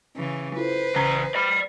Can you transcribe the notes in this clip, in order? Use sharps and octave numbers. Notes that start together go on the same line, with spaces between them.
C#3 E3
E4 F4 A4 B4 C5
A1 C#3 E3 A#5
D5 B5 C#7